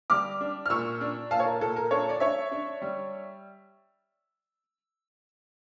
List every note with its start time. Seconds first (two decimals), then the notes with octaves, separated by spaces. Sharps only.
0.10 G3 D6 F6
0.41 D4
0.66 F6
0.70 A#2 C#6 E6
1.01 D4
1.31 A#2 F5 A5
1.40 C#5
1.45 A#4
1.61 A#2 A4
1.76 A#4
1.91 D4 A4 C#5
2.09 D5
2.20 D4 C#5 E5
2.52 D4
2.82 G3